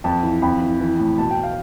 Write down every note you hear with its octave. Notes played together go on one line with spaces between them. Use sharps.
F2 A5
E3
F2 B5
E3
E3
A2
B2 A5
G5
F5